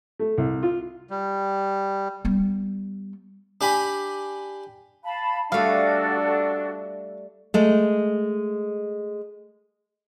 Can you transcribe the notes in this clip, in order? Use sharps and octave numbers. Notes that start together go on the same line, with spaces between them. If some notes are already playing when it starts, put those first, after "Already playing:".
A3
C2
F4
G3
G3 B3
D4 G4 G#5 B5
F5 A5 B5
G3 A3 D4 F#4 A4 F5
G#3 A3